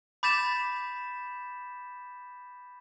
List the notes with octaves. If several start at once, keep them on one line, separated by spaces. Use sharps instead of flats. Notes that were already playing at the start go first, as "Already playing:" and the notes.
B5 D6 G6 A6 B6 E7